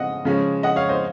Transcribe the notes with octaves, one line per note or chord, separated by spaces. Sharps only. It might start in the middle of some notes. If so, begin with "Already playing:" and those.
Already playing: C#3 G#3 C4 D#5 F#5
C#3 F3 G#3 C#4
D#5 F#5
C#5 F5
C5 D#5